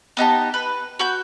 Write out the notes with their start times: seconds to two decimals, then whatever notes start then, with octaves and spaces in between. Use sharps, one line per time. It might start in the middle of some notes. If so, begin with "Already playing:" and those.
0.17 B3 D#4 G4 A5
0.54 B4
0.99 F#4 B5 G6